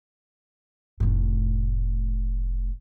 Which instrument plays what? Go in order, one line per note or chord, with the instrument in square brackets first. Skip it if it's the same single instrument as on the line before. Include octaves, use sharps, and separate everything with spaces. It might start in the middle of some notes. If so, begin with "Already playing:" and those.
[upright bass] F1 A2